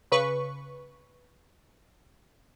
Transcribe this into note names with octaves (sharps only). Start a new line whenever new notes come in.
C#3 B4 C#6